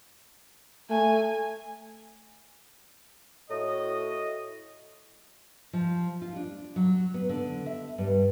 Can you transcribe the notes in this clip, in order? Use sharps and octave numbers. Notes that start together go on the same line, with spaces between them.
A3 G#5
A2 F#4 D#5
F3
F4
D4
F#3
B3
D3
E5
G2